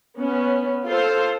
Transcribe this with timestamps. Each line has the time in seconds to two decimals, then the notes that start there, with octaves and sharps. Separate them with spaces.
0.18 B3 C#4
0.86 F4 A4 C5